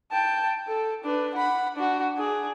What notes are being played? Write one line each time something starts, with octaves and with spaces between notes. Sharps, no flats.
G5 A5
A4
D4 B4
F#5 B5
D4 F#4
D4 G#4